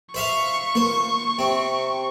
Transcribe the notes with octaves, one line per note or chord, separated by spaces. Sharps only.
C5 E5 F5 C#6
A#3 C5
C3 C4